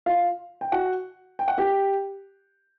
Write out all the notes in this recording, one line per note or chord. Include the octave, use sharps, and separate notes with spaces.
F4 F5
G5
F#4 F#5
G5
F#5
G4 G5